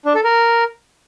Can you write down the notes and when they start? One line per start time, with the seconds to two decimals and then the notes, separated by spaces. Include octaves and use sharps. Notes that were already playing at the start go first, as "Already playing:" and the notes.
0.05 D4
0.15 A4
0.24 A#4